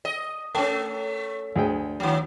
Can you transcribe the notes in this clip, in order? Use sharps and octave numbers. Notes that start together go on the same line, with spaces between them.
D#5
A3 C#4 A5
D2 G#4 G5
D#3 F#3